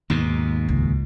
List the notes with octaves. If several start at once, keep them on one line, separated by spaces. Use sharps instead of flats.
D#2 G#2 B2
C#2